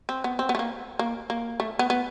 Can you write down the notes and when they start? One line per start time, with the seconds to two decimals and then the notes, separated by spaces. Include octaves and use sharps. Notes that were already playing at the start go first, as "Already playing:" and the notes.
0.09 C4
0.24 B3
0.39 C4
0.49 B3
0.55 A3
0.59 A#3
0.99 A#3
1.30 A#3
1.60 A3
1.79 B3
1.90 B3